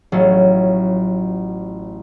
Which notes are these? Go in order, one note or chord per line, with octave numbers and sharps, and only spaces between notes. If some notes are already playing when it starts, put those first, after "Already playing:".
A1 F#3 F4